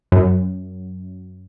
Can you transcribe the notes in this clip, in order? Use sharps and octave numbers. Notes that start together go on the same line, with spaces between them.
F#2